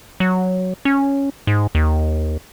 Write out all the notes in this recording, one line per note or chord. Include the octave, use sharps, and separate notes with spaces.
F#3
C#4
G#2
D#2